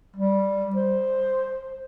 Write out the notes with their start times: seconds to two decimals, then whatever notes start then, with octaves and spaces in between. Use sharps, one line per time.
0.16 G3
0.75 C5